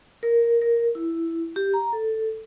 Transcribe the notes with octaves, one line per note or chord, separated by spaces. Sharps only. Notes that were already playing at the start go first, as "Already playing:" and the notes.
A#4
A#4
E4
G4
A#5
A4